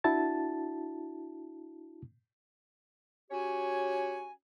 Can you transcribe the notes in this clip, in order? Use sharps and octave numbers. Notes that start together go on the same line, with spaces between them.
D4 E4 F#4 A5 A6
C#4 F#4 G4 C#5 G#5